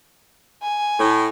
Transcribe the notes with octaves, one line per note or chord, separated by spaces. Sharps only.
G#5
A2